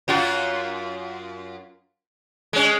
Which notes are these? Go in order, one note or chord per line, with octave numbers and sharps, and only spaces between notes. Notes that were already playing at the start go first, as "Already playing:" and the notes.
F#2 F4 F#4
G#3 C#4